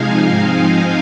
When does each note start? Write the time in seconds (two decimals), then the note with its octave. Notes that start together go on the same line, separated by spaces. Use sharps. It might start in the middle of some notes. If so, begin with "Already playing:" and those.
Already playing: C3 F3 G#3 D#4 F5 G#5
0.28 G#2 F3 G#3 C4 D#4